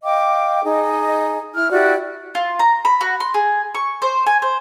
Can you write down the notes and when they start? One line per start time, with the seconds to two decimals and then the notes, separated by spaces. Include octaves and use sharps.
0.04 D#5 F5 G5 D6
0.64 D#4 G#4 D#5
1.54 E4 F6
1.70 E4 F#4 G4 D5
2.35 F4
2.59 A#5
2.85 B5
3.01 F#4
3.20 C6
3.34 G#4
3.75 C#6
4.02 C5
4.27 G#5
4.42 C5